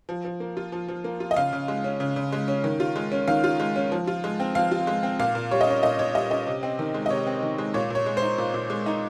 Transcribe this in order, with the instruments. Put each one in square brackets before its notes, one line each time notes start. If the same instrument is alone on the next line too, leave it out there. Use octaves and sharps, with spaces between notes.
[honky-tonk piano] F3
F3
A#3
F4
F3
F3
A#3
F4
D#5
C#3 F5
C#3
G#3
C#4
C#3
C#3
G#3
C#4
D#3
F4
G#3
C#4
D#3 F5
F4
G#3
C#4
F3
F4
G#3
C4
F3 F5
F4
G#3
C4
A#2 F5
A#2
G3 C#5
D#5
C#4 C#5
A#2 D#5
A#2 C#5
G3 D#5
C#4 D#5
C3
C4
D#3
G#3
D#5
C3 C#5
C4
D#3
G#3
A#2 C#5
A#2 C#5
G#3
C5
D#4
A#2
A#2
G#3
D#4